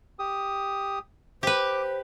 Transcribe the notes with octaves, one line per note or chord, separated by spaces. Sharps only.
G4 D#6
G4 B4 C5 D6